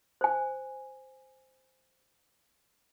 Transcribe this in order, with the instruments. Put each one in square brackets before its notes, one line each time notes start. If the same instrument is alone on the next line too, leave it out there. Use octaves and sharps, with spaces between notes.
[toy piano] C5 G#5